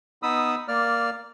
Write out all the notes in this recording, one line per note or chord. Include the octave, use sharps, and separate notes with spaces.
B3 D#4 B5 D#6 E6
A#3 D5 F6